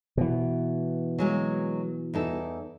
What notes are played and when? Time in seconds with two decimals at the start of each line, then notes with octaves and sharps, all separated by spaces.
0.17 B2 E3
1.18 F#3 G#3 A#3
2.14 E2 D#4 A4